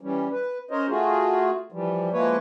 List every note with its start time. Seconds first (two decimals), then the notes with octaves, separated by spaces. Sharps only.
0.01 E3 G3 C#4
0.31 B4
0.71 C#4 A#4 C5 C#5 D#5
0.89 A3 F4 F#4 G#4
1.72 E3 F3 G3
2.13 F3 G#3 A#3 E4 B4 C#5